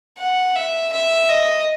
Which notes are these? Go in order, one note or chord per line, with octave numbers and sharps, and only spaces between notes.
F#5
E5
E5
D#5